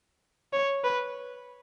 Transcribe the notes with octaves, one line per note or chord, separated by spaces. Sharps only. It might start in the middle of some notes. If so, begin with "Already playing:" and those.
C#5
B4